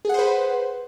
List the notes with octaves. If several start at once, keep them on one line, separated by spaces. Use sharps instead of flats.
G#4 B4 C5 F#5